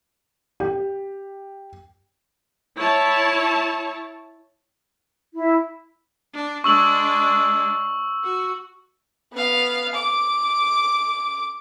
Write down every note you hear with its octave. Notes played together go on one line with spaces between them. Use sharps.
G4
E4 C#5 A5
E4
D4
G#3 D4 C#6 E6 F#7
F#4
B3 F5
D6